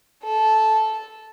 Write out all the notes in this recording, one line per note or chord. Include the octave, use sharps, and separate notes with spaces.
A4